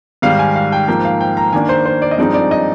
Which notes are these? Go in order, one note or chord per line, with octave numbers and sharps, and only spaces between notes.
G#2 D#3 G3 F5
G#5
F5
G5
G#2 F3 A#3 G5
F5
G5
A#5
D#3 A#3 D4 G#5
C5
C5
D5
D#5
G2 F3 G#3 C4 D#4 D5
D5
D#5